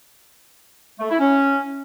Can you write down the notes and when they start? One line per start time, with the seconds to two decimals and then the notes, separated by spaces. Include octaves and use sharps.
0.99 A3
1.09 E4
1.19 C#4